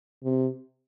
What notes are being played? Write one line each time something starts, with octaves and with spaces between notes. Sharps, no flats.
C3